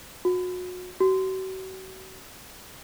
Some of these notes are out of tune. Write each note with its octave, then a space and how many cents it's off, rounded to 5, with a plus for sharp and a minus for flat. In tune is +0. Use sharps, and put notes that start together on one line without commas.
F#4 -30
F#4 +40